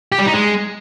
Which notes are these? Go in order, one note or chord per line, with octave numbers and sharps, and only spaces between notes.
G4
G3
D#4
G#3